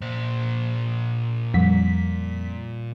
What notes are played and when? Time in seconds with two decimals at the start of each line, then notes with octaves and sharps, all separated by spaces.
0.01 A#2 C5
1.54 F2 G3 B6